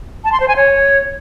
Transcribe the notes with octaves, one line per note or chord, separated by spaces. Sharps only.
A5
C6
C5
G#5
C#5